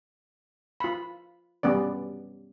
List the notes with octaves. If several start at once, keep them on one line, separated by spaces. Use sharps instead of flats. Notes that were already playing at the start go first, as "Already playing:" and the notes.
F4 B5
G3 B3 C#4 D5